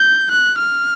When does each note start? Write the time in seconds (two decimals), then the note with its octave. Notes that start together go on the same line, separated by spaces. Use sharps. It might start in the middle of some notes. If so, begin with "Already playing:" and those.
Already playing: G6
0.31 F#6
0.59 F6